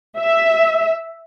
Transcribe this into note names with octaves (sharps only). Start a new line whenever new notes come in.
E5